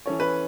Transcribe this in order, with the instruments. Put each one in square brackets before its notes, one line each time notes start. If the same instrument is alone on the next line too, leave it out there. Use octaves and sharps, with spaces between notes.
[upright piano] E3 C#4 A4 C#5
[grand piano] B4